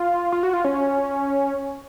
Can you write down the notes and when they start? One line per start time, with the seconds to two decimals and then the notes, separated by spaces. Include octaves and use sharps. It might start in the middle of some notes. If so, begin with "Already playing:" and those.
Already playing: F4
0.32 F4
0.43 F#4
0.53 F4
0.64 C#4